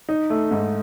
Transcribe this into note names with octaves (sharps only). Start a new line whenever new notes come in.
D#4
A3
G#2